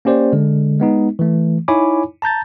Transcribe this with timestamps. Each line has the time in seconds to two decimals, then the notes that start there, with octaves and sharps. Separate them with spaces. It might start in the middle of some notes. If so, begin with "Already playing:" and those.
0.05 A#3 C#4 G4 C5 D5
0.33 D3 G#3
0.80 G#3 B3 D#4
1.19 E3 A3
1.68 D#4 E4 C#5 G#5 B5 D6
2.22 A5 A#5 G6 A6